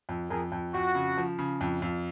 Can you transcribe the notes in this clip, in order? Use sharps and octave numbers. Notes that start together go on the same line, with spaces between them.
F2
F2 G#4 A#4
F2
F2 F#4
C#3
F3
C#3
F2
F2